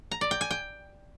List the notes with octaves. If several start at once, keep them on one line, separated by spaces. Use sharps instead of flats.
A#5
D5
G5
G#5
G5